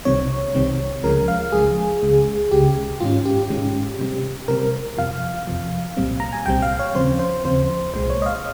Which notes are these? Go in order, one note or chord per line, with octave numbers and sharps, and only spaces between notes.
C2 C3 D#3 G3 C4 C#5
C2 C3 D#3 G3 C4
C#2 C#3 F3 G#3 A#4
F5
C#2 C#3 F3 G#3 G#4
C#2 C#3 G#3
C#2 C#3 G#3 G4
G#2 D#3 G#3 C#4 F4
G4
G#2 D#3 G#3 C#4
C3 G3 C4
C3 G3 C4 A#4
F2 C3 F3 F5
F2 C3 F3
C2 A#2 G3 C4
A#5
G#5
C2 A#2 G3 C4 G5
F5
C#5
D#2 C#3 F3 C4 C5
C5
D#2 C#3 F3 C4 C5
C2 A#2 G#3 C5
C#5
D#5
F5